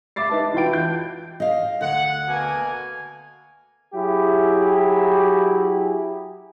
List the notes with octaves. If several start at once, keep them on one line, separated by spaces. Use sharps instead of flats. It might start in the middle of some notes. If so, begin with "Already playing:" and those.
E5 D6 A6 C7
D#4 B4 A5
E3 F4 F#4 G5 D7
G6
D#5 F5
D2 F#5
B2 A#3 G#5
F#3 E4 G4 G#4